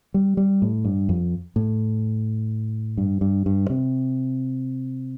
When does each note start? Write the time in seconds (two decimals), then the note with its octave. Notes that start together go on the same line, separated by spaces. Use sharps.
0.14 G3
0.37 G3
0.62 A2
0.85 G2
1.09 F2
1.56 A2
2.98 G2
3.21 G2
3.46 G2
3.70 C3